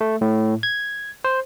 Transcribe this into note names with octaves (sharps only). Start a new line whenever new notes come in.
A3
A2
G#6
C5